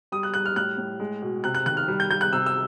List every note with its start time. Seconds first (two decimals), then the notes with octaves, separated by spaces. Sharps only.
0.12 G3 D#6
0.23 F#6
0.34 G3 F#6
0.46 F6
0.56 A2 F#6
0.78 A2
1.00 G#3
1.22 B2
1.44 C3 F#6
1.55 F#6
1.66 D#3 F#6
1.77 F6
1.88 G3
2.00 G6
2.11 G3 G6
2.21 F#6
2.32 C3 E6
2.46 E6